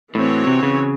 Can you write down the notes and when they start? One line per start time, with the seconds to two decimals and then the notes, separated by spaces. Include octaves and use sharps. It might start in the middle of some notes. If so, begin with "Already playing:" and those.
0.14 A2 E3 C4 F#4 C#5
0.47 C3
0.63 C#3